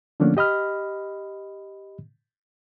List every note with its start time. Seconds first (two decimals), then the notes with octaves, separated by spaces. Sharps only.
0.20 D3 F3 A3 A#3 C#4 D4
0.37 G4 D#5 B5 F6